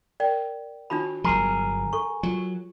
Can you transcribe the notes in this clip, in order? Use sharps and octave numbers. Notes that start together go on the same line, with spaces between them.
A#4 D5 G5
D#3 D4 F4 F#4 A5 B5
G1 F#3 G#4 A#4
A4 C#6
F#3 F4